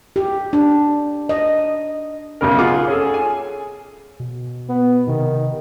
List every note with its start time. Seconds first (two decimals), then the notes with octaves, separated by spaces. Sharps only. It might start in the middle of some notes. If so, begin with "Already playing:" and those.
0.16 G4
0.53 D4
1.29 D#5
2.41 B1 F#2 C#3 A#4
2.59 F4 G#4 F#5 D6
2.88 C#4 G#4 A4
3.14 G#5
4.20 B2
4.69 B3
5.08 C3 D#3